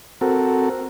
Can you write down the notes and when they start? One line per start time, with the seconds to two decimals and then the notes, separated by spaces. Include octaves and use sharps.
0.21 C4 F#4 A4 A#4